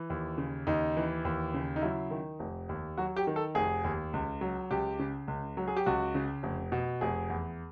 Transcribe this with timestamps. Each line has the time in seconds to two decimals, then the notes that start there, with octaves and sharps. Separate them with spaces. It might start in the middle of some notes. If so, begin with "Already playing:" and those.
Already playing: E3
0.10 D#2
0.38 C#3
0.67 D#2 D#4
0.97 E3
1.25 D#2
1.54 C#3
1.76 D#4
1.82 F#3 E4
2.11 D#3
2.39 F1
2.69 D#2
2.97 F#3 F#4
3.16 G4
3.27 D#3
3.36 A4
3.55 F1 G#4
3.84 D#2
4.13 C#2
4.41 F#3
4.71 C#2 G4
4.99 C#3
5.28 C#2
5.57 F#3
5.68 G#4
5.76 G4
5.86 C#2 F#4
6.15 C#3
6.43 F1
6.72 B2
7.01 F1 G#4
7.30 E2